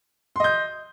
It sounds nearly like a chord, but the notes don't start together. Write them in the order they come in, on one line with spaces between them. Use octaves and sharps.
C6 D#5 G6